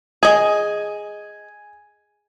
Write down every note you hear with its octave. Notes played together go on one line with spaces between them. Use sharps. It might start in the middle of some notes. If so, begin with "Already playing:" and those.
G#4 D#5 G#5